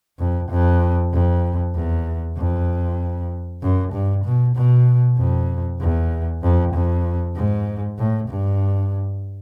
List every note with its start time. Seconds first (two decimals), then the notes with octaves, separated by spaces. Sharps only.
0.19 F2
0.50 F2
1.13 F2
1.75 E2
2.37 F2
3.62 F#2
3.93 G2
4.25 B2
4.56 B2
5.17 F2
5.81 E2
6.42 F2
6.74 F2
7.36 G#2
7.98 A2
8.29 G2